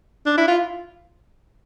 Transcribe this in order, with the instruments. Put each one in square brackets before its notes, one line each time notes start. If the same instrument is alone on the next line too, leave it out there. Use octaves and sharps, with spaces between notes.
[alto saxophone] D4
E4
F4